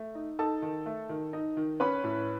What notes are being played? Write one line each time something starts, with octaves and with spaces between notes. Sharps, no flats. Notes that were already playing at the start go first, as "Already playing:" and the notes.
Already playing: A3
D#4
D#4 A4 A5
D#3
A3
D#3
D#4
D#3
C#4 B4 B5
A2